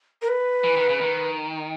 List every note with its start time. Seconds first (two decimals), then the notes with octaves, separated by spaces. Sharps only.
0.22 A#4
0.28 B4
0.64 E3
0.76 D#3
0.89 C#3
1.01 D#3